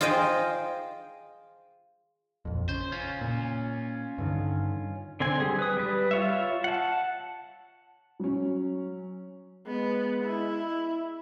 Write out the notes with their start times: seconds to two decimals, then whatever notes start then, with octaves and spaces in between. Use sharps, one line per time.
0.01 F4 G#4 C5 D#5 G5
2.45 A#1 F2
2.69 C#3 C5
2.92 C#4 F4
3.21 A#2
4.18 G2 D3 D#3
5.20 D3 C4 G#5
5.40 G3 G#4
5.59 B4 D#6
5.77 G3 B4
6.11 F4 C#5 E5
6.64 F#5 A5
8.20 F#3 C#4
9.67 G#3 B3
10.24 E4